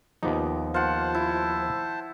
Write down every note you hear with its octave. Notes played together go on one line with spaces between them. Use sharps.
D#2 F3 B3 D#4 D6
F4 C5 F#5 A5
E4